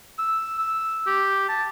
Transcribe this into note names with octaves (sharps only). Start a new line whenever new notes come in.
E6
E6
G4
A5